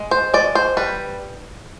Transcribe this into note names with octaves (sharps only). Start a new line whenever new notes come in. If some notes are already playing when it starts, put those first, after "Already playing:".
Already playing: G#3
C5
G#3 D5
C5
G3 B4